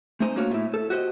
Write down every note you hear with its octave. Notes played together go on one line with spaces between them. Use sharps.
A3 C4 D#4 C5 G#5 C6
A#3 D4 F#4 C#5 F5
A2 E4
A4
F#4 G4 C5 D#5